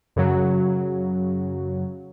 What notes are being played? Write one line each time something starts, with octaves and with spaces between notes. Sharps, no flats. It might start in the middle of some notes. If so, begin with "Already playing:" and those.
F#2 C#3 F#3